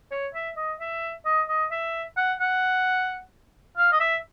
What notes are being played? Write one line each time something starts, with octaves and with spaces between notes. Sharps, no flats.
C#5
E5
D#5
E5
D#5
D#5
E5
F#5
F#5
F5
D#5
E5